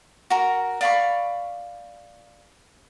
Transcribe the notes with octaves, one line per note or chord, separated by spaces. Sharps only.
F#4 A#4
D5 F5 B5 C#6